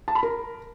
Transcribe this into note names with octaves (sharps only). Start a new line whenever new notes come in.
A5
B5
A#4